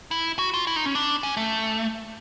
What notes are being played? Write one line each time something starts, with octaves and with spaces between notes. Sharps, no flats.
E4
F#4
F4
E4
D#4
C#4
D4
C#4
A3